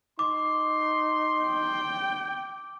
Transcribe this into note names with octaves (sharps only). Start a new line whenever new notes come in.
D#4 C6 D6
G5